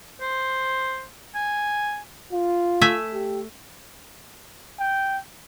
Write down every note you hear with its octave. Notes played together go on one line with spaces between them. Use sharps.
C5
G#5
F4
A3 E5 G#5
G4
G5